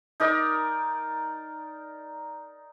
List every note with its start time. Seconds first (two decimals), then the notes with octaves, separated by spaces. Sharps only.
0.20 D#4 A#4 D5